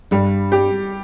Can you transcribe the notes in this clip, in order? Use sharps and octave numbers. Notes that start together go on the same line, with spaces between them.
G2 G3
G4